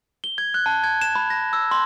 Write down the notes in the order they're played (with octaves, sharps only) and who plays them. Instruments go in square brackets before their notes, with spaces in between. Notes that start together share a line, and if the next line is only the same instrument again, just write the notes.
[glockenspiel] G7
G#6
F#6
A5
G#6
E7
B5
A#6
E6
C6